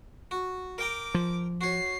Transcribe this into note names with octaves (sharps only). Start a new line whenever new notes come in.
F#4
A#4 G5 A#5 D6
F3
F#4 C#5 C7